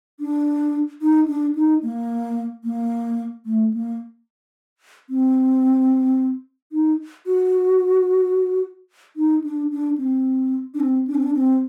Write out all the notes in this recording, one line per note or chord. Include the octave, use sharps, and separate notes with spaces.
D4
D#4
D4
D#4
A#3
A#3
A3
A#3
C4
D#4
F#4
D#4
D4
D4
C4
D4
C4
D4
C4
D4
C4